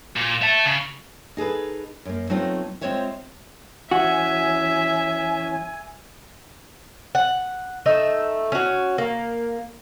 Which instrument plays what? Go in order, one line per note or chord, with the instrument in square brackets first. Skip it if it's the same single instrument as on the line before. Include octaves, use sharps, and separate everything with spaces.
[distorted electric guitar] A#2
E5 A5
C#3
[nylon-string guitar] D#4 G#4 A4 B4
F#2 A#3
F#3 A3 B3 C4 D#4 F4
G#3 C4 F4 C5 C#5 E5
[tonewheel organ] E3 C#4 [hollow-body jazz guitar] F#4 [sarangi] E5 [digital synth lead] G#5
[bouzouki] F#5
A3 D#4 E5
C#4 F#4
A#3